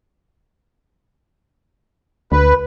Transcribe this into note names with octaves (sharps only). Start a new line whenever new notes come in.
D2 B4